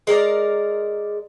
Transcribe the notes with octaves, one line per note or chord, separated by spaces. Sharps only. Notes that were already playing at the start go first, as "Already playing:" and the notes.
G#3 A#4 C#5 D5